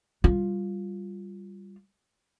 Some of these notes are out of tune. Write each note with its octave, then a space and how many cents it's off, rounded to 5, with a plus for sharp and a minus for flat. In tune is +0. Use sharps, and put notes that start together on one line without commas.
G3 +0 F4 +0